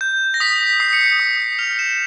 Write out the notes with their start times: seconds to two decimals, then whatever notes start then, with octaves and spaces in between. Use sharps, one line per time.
0.01 G6
0.34 A#6
0.40 D#6 B6
0.80 D#6 C7
0.93 C#7
1.07 C7
1.20 D#6
1.59 F6 F7
1.79 E7